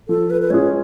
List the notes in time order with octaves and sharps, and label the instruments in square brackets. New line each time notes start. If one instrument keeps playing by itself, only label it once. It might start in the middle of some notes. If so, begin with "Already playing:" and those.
[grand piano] F3 [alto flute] A4
[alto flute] B4
B4
[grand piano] G#3 C#4 F4 G#4 [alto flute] C#5